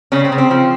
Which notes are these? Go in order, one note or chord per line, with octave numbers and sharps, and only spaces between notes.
C#3 C#4
C4
C#3
C4
F3